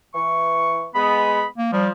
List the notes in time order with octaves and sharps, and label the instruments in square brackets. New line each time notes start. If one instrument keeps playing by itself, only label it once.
[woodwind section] E3 C#6
[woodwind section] G#3 B3 [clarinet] B5
[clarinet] A#3
[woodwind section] F3 [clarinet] G3